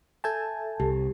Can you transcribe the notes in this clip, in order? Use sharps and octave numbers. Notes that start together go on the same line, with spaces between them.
A4 E5 G#5 A5 G6 G#6
C2 G4